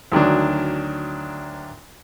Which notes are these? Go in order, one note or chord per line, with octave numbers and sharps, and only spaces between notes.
D2 D#3 F#3 D4